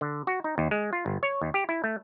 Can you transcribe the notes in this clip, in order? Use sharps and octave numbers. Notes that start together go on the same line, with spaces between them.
D3
F#4
D#4
D#2
G#3
F4
G1
C#5
D#2
G4
E4
A3